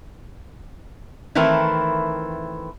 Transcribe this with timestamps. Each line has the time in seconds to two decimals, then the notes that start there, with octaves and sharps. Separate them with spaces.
1.35 D#3 E3 A3 C4 E4 A#4